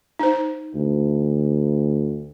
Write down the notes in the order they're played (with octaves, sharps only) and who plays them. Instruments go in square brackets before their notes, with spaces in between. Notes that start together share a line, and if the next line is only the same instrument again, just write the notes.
[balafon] D#4 C5
[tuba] D2